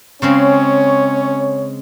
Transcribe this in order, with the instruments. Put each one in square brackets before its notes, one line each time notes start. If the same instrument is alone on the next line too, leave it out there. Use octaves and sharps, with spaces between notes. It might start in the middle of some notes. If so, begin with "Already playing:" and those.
[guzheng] C#3 G#3 C4 [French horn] C#4 [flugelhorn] C#5